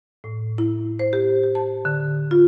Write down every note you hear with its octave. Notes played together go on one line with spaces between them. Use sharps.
A2
E4
C5
G4
G4
A5
D3
F4